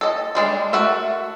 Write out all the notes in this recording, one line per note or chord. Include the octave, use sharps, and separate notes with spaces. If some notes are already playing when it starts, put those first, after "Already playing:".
A4 D#5
G3 G#3 D4
A3 F#4 A#4 E5